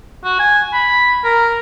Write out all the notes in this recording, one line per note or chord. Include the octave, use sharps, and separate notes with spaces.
F#4
G#5
B5
A#4